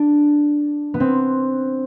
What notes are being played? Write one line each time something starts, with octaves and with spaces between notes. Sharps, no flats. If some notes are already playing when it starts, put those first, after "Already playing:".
Already playing: D4
B3
C4